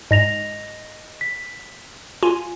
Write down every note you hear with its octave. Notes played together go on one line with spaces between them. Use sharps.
G#2 D#5 A#6 F7
B6
F4 G#5